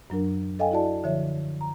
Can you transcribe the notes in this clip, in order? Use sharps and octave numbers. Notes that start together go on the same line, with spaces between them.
F#2 F#3 D4 A#4
A4 D#5 F5 G5 G#5
E4 F#4 D5 A5
D3 F3 C#5 E5
A#5